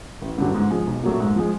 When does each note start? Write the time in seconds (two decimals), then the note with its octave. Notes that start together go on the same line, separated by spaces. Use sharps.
0.22 A1
0.38 G2 D3 F#3
0.55 G#2
0.71 F3 G#3
0.87 B1
1.03 A#2 F#3 A3
1.20 G#2
1.36 F3 G#3